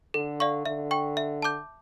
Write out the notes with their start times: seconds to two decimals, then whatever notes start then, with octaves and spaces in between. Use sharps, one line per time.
0.14 D3 A4
0.40 D5 F5 C#6
0.66 D3 E5
0.91 G5 C#6
1.17 E5
1.42 A5 D6 G6